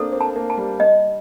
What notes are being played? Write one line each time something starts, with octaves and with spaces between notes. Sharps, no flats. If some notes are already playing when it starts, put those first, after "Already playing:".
Already playing: A#3 C4 D4 A4
C4
A5
A#3
A5
G3
G3 D#5